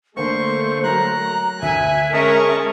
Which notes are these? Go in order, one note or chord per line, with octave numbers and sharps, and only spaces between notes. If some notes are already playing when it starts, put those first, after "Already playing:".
D3 A3 A#3 C5 C#6
F#3 A#4 A#5 F#6
D2 E5 G#5
G#3 C#4 A#4 D#5 A5 C#6 D#6